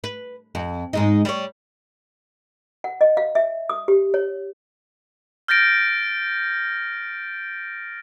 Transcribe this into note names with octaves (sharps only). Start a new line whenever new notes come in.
B4
F2
G#2 G#3 D#4
G3 C#5
F#5
D#5
F5
E5
D#6
G4
C#5
F6 G6 A6 A#6 D7